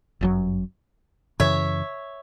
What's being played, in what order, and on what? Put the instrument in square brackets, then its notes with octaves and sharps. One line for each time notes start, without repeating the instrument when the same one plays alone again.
[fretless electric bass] G1 F#2 C#3 F#3
[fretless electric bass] F#2 C#3 E3 [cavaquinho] C#5 E5